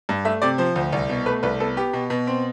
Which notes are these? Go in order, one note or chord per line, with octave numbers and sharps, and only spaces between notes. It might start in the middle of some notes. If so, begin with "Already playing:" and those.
G2
A3 E5
C3 D5
F3 C5
D2
C2
B2
A3 B4
C2 B4
B3 A4
B3 G4
B2
B2
C4